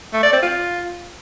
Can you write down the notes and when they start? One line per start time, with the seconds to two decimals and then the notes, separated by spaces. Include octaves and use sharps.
0.13 A3
0.23 D5
0.33 C4
0.42 F4